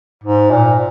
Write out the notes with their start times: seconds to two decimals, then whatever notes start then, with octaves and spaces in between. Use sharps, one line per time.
0.23 G#2
0.51 A#2